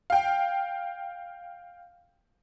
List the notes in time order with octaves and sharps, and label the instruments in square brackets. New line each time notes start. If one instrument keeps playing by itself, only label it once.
[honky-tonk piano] F5 G5